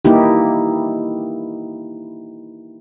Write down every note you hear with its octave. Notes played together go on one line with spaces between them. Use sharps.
A#3 D#4 E4 G4